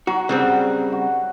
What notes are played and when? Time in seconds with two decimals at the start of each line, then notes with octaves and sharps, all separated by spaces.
0.07 F#3 F#4
0.29 C#3 G3 C4 F#5
0.92 F#4